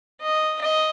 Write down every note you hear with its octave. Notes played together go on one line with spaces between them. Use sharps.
D#5
D#5